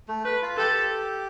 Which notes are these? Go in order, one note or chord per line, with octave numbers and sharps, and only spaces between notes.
A3
B4
F4
G4 A4